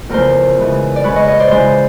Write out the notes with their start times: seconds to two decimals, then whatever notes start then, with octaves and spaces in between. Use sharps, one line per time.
0.09 E2 C#3 F3 A3 A#4 C5
0.58 C#3 E3 G#3
0.96 D5
1.04 C#3 E3 G#3 B4 C#5
1.16 C#5 D#5
1.27 C#5 D#5
1.40 C5 D5
1.51 C#3 E3 G#3 C5 D5